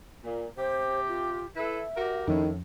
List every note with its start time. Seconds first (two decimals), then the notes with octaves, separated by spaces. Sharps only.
0.24 A#2
0.58 C3 G4 C5
1.08 F4
1.56 E4 A4 B4 E5
1.97 F#4 G4 A#4
2.27 F2 A2 D#3 F3 C#4